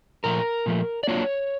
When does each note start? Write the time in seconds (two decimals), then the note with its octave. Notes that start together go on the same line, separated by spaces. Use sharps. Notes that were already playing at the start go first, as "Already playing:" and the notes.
0.24 A#2 F3 A3 A#4
0.66 A#2 F3 A3
1.03 D5
1.08 F#3 A#3 D4 F4 C#5